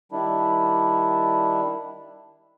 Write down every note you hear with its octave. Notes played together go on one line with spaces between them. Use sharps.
D#3 G3 D4 E4